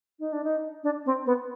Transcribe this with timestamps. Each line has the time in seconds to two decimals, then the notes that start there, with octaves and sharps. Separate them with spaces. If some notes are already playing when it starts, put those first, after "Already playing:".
0.19 D#4
0.32 D4
0.44 D#4
0.83 D4
1.06 C4
1.26 B3